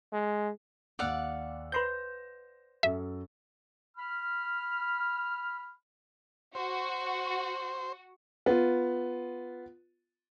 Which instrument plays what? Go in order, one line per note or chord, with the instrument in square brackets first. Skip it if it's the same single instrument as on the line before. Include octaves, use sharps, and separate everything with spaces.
[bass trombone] G#3
[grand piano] D#2 E6 [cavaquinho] D5 F5 F#5
[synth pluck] B4 C6 G6 [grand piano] C5 A#6 E7
[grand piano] F#2 A4 [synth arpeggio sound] E5
[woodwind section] B5 F6
[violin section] F#4 [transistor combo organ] C5
[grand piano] B3 F4